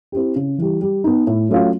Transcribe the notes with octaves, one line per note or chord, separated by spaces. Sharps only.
C4 E4 G4
C#3
E3 G3
G3
B3 D#4
A2
F#3 A3 C#4 F4